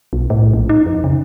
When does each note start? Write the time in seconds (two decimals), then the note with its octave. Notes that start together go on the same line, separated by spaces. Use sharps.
0.13 B1
0.30 A2
0.54 A#1
0.69 D#4
0.86 F2
1.04 C#3